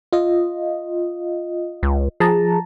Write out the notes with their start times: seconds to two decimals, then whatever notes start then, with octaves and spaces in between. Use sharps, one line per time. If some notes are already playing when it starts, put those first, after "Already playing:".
0.13 F4 D#5
1.83 C#2
2.20 F3 G#4 A5 A#5